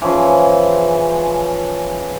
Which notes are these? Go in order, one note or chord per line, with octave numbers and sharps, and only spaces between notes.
E3 F3 C#4 G#4